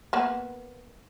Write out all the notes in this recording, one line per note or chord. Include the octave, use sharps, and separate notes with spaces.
A#3 B3